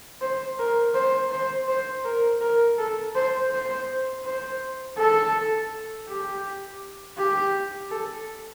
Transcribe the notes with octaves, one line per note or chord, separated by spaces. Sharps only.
C5
A#4
C5
C5
C5
A#4
A#4
A4
C5
C5
C5
A4
G4
G4
A4